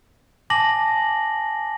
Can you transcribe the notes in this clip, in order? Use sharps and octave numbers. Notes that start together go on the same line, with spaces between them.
G#5 A5 D6 A#6 F#7